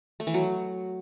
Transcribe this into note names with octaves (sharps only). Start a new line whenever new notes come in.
A3
E3
F#3